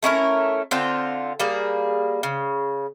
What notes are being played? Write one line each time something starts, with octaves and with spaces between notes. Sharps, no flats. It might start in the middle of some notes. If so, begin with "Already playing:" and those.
A3 C#4 E4 A#4
D3 C4 F4 G5
G3 A#3 G#4
C#3